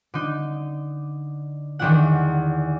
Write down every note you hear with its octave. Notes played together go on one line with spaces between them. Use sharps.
D3 D#4
E2 D3 D#3 D4 E4 F#5